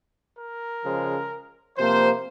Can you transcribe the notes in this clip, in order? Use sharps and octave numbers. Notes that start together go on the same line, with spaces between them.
A#4
C#3 F3 G#3
C3 F3 A#3 C5